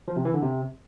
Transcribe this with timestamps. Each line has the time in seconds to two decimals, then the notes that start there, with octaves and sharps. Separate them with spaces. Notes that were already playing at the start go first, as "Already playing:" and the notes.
0.08 F3
0.16 C3
0.25 E3
0.34 D3
0.43 C3